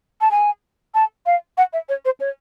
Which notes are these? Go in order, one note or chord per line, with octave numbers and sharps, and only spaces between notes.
A5
G#5
A5
F5
F#5
E5
C#5
C5
C#5